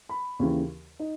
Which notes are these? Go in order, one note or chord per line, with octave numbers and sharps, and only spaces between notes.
B5
D#2 C#3 E3
D#4